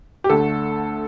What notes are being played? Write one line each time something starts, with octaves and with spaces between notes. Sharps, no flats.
G4
D2 D3 A3 A4